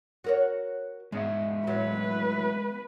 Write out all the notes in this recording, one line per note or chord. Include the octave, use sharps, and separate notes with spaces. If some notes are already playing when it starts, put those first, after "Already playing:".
F#4 A#4 C#5
G#2 G#3 B3 E5
A2 F#3 B4